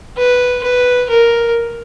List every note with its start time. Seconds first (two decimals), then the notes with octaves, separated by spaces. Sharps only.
0.18 B4
0.63 B4
1.10 A#4